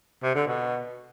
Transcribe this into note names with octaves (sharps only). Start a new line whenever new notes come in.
C3
D3
B2